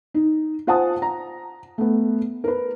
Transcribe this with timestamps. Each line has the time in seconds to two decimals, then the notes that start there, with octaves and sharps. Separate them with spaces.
0.14 D#4
0.67 F4 C5 F#5 G#5 A5 D#6
1.02 A#5
1.78 A3 B3
2.44 A#4 B4